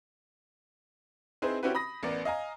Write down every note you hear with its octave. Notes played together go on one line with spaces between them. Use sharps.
C4 D#4 E4 G#4 B4 C5
C4 C#4 E4 F#4 G4 B4
B5 D#6 A#6
A1 B3 A#4 D5
D#5 F5 G#5 A#5